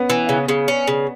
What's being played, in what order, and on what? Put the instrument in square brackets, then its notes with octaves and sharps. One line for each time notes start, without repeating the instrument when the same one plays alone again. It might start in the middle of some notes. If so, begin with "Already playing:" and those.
Already playing: [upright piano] B3 C#4
[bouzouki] E3
C#3
C#3
C#4
C#3